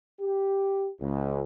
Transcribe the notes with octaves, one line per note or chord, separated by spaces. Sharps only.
G4
C#2